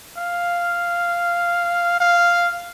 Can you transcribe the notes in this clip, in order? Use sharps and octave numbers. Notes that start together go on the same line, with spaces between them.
F5
F5